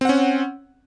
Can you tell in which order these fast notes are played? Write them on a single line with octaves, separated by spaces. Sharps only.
C4 F#5 C#4